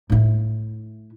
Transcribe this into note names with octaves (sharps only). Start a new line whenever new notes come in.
A2 E4